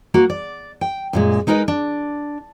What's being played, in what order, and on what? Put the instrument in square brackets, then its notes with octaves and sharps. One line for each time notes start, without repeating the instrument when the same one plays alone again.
[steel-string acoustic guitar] F#3 A#3 F#4
D5
G5
F#2 A#2 G#3
G#3 D#4 A#4 B4 D#5
D4